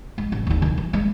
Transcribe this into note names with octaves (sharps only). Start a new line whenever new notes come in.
G#3
A1
D#2 D3
D#3
E3
G#3 A#3